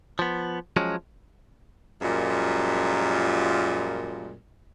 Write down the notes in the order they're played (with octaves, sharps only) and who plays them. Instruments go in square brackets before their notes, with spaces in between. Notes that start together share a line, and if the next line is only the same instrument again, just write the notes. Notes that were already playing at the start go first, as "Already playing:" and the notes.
[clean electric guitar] F3 B3
F3 F#3 G#3 C#4
[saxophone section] F#2 A#2 F3 G3 G#3